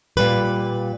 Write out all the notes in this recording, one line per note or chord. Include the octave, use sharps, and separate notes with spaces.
A#2 G3 B4